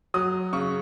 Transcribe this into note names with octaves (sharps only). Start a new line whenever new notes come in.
F#3 D#6
C#3 C#6